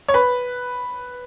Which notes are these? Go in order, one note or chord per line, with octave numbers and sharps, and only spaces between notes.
C#5
B4